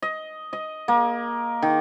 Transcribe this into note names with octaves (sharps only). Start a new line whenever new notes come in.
D#5
D#5
A#3
D#3